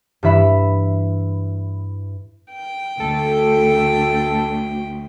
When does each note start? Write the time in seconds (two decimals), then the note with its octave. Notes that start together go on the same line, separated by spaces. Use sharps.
0.23 G2 E3 E5 B5
2.52 G5
3.00 D2 A4